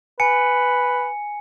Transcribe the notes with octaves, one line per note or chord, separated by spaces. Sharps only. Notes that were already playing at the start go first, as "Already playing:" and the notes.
B4 G#5 C#7